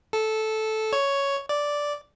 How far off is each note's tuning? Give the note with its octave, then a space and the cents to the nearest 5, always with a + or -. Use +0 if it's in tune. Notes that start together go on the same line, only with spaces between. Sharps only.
A4 -10
C#5 +5
D5 -5